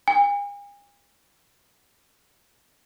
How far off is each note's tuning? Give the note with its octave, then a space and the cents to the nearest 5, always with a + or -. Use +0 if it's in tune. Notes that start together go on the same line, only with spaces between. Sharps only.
G#5 -45